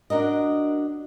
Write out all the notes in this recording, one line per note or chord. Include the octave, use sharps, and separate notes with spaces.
D4 F#4 A#4 D#5